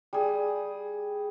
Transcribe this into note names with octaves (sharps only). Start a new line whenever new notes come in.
G3 G#4